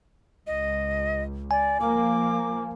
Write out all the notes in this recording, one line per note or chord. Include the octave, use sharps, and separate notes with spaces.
C#2 D#5
D5 G#5
F3 A#3 D6